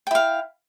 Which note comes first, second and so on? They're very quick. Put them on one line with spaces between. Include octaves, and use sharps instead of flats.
G5 E4 F5